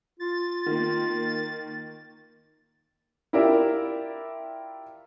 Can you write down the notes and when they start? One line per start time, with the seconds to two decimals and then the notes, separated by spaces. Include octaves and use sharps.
0.19 F4 A6
0.66 D#3 A#3
3.33 E4 F4 G4 A#4 D5 E5